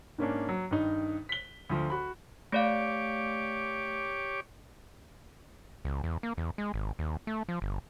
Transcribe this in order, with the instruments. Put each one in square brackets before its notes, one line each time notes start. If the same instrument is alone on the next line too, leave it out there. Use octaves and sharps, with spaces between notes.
[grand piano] G#2 A#3 C#4 D4
F#3
G2 D#3 D#4
B6 G7
D2 F3
F#4 B5
[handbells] A3 D5 F5 [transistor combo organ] G4 C#5 D6
[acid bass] C#2
E2
A#3
E2
G#3
G#1
D#2
A3
F3
G1